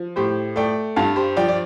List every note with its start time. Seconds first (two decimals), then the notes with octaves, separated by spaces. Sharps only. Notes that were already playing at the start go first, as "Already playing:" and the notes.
Already playing: F3
0.16 A2 G4 C5
0.56 A3 D5 G5
0.96 G2 F5 A5
1.16 G4 C5
1.37 F3 D5 G5
1.49 D5